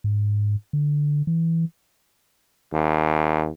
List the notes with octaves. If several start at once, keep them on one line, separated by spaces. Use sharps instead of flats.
G#2
D3
E3
D#2